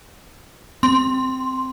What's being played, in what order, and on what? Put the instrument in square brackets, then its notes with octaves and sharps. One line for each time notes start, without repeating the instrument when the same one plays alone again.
[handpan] C4 [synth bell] C6